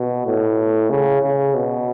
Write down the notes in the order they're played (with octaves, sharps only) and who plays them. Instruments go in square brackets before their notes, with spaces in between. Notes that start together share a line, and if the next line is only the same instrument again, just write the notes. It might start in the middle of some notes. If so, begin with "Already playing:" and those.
Already playing: [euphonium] B2
A2
C#3
C#3
B2